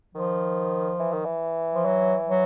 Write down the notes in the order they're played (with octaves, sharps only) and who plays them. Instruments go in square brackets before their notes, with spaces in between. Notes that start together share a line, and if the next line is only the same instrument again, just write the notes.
[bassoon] D#3 [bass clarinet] F3
[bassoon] E3
D#3
E3
[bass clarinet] F3
F#3
F#3